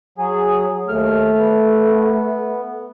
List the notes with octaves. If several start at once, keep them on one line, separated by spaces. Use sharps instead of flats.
F#3 G#4
D#2 A3 F6
B3